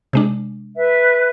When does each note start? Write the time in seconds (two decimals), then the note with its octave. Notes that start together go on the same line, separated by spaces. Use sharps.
0.13 C3 G#3 D4
0.76 B4 E5